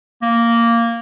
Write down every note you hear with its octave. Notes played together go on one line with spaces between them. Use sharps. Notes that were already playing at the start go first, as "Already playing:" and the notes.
A#3